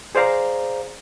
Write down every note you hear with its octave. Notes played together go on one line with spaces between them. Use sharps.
G#4 C5 D5 F5 A#5